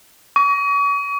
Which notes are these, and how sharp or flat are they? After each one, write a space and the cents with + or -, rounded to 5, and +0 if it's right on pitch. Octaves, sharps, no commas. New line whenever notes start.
C#6 +40